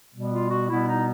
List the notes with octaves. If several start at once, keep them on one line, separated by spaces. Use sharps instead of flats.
B2 G3 B3
F4
F#4
B2 G3 B3 E4
D#4